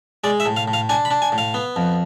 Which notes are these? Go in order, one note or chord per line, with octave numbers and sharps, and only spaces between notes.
G#3 D5
E5
A2
F5
A2
F5
D4 G#5
B5
D4
G#5
A2
F5
B3
F2